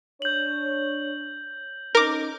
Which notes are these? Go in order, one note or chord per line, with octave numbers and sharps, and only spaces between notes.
D4 C#5 G6 F#7
C#4 D#4 A#4 D6